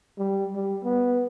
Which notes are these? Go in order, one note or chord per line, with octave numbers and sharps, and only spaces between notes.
G3
G3
B3